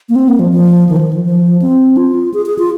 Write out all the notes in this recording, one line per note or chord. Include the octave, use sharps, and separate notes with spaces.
A#3
C4
A#3
F3
F3
D#3
F3
D#3
F3
F3
C4
F4
G#4
G#4
F4